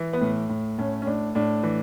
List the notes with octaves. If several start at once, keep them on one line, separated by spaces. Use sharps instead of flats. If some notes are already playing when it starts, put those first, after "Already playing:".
Already playing: E3
B3
A2
A2
A2 C#4
C#4
A2 D4
A2 D4
E3